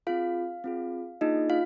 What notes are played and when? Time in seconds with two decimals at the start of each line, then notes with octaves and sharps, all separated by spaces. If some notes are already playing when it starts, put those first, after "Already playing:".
0.07 C4 F4 G#4 F5
0.64 C4 F4 G#4
1.21 A#3 D4 D#4 F4 G#4 D#5
1.50 F4 F5